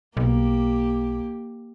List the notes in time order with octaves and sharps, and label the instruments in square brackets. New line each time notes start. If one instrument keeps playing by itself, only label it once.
[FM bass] B1 [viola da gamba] A#3 G4